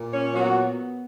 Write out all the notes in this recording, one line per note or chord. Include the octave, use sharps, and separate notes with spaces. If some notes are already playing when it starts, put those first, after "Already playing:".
Already playing: A#2
C#4 C#5
F#3 B3 F#4